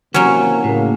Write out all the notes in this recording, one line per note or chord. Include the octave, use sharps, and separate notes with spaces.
C3 E3 F#3 A#3 C#4 F#4
A2 C#3 A#3